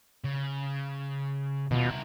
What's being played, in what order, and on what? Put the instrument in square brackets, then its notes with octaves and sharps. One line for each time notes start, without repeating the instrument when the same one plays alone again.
[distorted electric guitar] C#3
[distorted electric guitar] D#2 F4 [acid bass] B2
[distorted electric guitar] E4 A#4